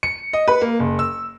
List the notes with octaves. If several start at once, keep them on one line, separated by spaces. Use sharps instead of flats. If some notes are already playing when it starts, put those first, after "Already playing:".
C#7
D#5
B4
A#3
F#1
E6